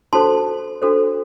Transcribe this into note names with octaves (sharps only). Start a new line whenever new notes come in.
D4 F#4 A4 C5 A5 C6
D4 F#4 A4 C5